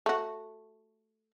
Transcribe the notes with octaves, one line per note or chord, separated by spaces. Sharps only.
A3 F#4